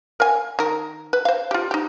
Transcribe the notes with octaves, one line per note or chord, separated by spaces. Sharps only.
A#4 F5 G#5
D#3 A#4
B4
C5 F5
F4 G4
D#4 G4